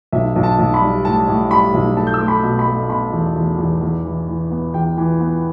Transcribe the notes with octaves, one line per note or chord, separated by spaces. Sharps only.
B1 E5
B1
A5
B1
B5
G3
A2 A5
A2
G3 B5
B1
A3 A5
G6
E6
A3 D6
B5
B2
B5
A3
B2 B5
E2
E2
E2
E2
E3
E3
B3
E2 G5
E3
B3